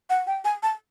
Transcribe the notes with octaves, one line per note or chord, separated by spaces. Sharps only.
F#5
G5
G#5
A5